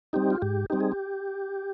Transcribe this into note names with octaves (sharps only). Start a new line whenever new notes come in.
G3 C4 D#4 G4
F4
G#2 G4
G3 C4 D#4 G4
G#4
G4